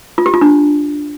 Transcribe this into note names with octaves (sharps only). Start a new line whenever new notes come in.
F4
G4
F4
D4